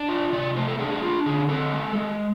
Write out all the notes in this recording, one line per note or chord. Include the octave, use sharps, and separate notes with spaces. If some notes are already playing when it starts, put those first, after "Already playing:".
Already playing: D4
F4 D5
C3 D5
A3 C5
A4
D4 G#4
G#4
D4 F4
D3 G#4
C4 A4
G#3
G#3